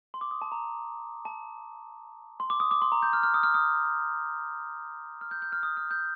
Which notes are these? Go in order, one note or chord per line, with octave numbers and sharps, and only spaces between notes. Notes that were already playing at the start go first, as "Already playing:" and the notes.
C6
D6
D#6
A5
A#5
A5
C6
D6
D#6
D6
C6
A#5
G6
F6
F6
D#6
F6
D#6
F6
G6
G6
F6
D#6
F6
G6